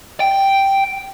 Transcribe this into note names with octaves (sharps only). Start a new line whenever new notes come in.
G5